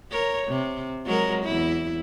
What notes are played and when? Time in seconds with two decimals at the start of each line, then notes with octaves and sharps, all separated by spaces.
0.12 A#4 C#5
0.48 C3
1.06 F#3 G#3 A#4
1.45 E2 E4